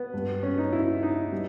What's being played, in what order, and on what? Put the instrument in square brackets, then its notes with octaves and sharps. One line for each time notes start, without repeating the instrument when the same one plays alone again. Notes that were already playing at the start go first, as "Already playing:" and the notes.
Already playing: [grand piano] B3
G2 G3
C#4
D#4
E4
D#4
G3